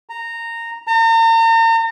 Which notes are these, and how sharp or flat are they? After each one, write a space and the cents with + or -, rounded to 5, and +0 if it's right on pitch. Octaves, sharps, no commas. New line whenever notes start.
A#5 -15
A#5 -40